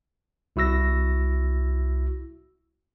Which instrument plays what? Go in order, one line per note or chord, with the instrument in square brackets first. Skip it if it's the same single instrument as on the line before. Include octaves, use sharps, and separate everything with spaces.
[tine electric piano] C2 E4 F#4 E6 A#6